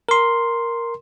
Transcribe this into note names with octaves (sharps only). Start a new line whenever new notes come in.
A#4 C6